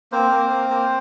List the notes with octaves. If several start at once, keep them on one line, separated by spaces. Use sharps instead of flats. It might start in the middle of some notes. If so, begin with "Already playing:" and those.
A#3 C4 C5
A#3
A#3
A#3